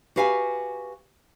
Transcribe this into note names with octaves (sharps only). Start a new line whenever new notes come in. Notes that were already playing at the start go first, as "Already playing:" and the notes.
F#4 G4 B4 F5 F#5 G#5